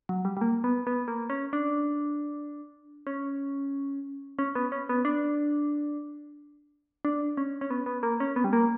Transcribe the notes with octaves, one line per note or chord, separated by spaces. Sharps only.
F#3
G3
G3
A#3
B3
B3
A#3
C#4
D4
C#4
C#4
B3
C#4
B3
D4
D4
C#4
C#4
B3
B3
A#3
C#4
B3
G3
A#3